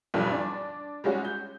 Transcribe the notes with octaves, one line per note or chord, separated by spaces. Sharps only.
B1 E2 G2 F3 G3 A4
D4
G3 G#3 C#4 F#4
G6